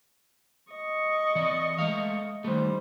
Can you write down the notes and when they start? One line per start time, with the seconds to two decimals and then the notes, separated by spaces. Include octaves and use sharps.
0.72 D#5 C#6
1.35 E3 D5
1.79 G#3 A3 F5
2.44 D#3 G3 A3 C5